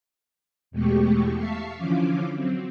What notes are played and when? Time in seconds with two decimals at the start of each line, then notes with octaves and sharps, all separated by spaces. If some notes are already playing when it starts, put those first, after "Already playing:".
0.71 E2 B2 G#3 A3 G4 C#6
1.37 E5 F5 A5 C#6 B6 C7
1.76 D3 E3 F3 C#4 F5 D6
2.32 F#3 C4